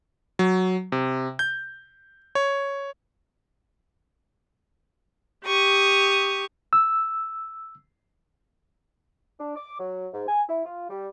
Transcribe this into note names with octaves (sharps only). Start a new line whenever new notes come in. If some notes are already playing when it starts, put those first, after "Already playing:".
F#3
C3
G6
C#5
G4 C#6 D#6
E6
D4
D6
F#3
G#2
G#5
E4
F4
G3